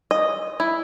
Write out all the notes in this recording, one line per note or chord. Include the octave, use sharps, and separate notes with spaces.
D#5
E4